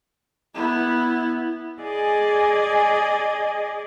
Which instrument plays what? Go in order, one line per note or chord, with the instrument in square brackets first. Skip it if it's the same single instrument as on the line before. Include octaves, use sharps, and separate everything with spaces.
[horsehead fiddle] B3 E4
[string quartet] G#4 D5 D#5 G#5